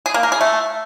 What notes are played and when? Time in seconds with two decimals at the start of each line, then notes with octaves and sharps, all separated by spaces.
0.06 G#4
0.14 A#3
0.23 A#4
0.32 G#4
0.41 A3